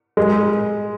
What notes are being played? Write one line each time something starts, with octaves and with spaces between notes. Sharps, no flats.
G#3